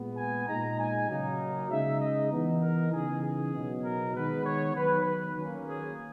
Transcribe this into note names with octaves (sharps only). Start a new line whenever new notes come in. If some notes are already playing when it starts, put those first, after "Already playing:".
Already playing: A#2 G#3 B3
G#5
A#2 G#3 D#4 A#5
G#5
C#3 F#3 A#3 D#4
C#3 G#3 D#4 E5
D#5
E3 B3 D#4
A#4
C#3 E3 B3 D#4 G#4
G#4
B2 F#3 B3 D#4
A#4
D#3 G#3 B3 B4
C#5
D#3 F#3 B3 D#4 B4
B4
D#3 F#3 A#3 C#4
G#4